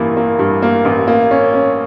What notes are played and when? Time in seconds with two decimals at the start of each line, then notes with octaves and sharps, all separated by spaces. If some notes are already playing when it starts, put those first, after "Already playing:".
Already playing: A1 G2 E3 A#3
0.17 A#3
0.39 G2
0.62 A#3
0.85 A1
1.07 A#3
1.31 C#4
1.54 C#4